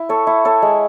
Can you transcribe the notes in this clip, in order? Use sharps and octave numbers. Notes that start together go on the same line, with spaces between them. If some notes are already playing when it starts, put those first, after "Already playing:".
Already playing: E4
A4 C#5
E4
A4 C#5
G#3